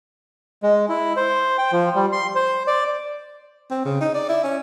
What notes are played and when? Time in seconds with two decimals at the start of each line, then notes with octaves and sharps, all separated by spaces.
0.63 G#3
0.89 E4
1.17 C5
1.58 G5
1.72 F3
1.95 G3
2.12 C6
2.35 C5
2.67 D5
3.71 C4
3.85 C#3
4.01 D#4
4.14 D5
4.29 E4
4.44 C#4